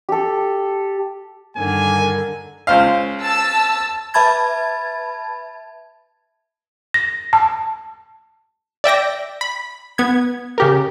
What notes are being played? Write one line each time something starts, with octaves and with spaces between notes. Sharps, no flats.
G4 A4
G2 D3 D#3 G#5
C#2 C5 F5
A5 E6
B4 E5 A5 B5 G#6 A6
A#6
A5
D5 E5 G5 A#6
B5
B3 G#6
C#3 G4 A#4